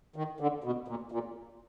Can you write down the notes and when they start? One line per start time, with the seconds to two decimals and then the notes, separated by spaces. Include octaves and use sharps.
0.16 D#3
0.40 D3
0.64 B2
0.88 A#2
1.12 A#2